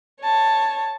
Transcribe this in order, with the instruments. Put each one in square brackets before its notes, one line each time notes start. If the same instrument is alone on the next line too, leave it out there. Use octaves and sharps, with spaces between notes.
[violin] C#5 A5